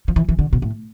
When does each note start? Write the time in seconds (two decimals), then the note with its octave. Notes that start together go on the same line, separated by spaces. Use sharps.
0.08 F3
0.16 E3
0.29 E3
0.39 D3
0.53 B2
0.62 A2